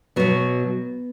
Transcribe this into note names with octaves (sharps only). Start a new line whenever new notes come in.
B2 F#3 B3